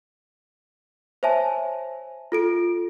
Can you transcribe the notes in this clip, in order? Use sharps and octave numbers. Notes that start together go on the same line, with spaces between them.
C5 C#5 E5 G#5 A5
F4 A4 D7